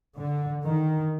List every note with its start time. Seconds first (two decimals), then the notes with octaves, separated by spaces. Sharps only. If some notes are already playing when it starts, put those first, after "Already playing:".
0.17 D3
0.64 D#3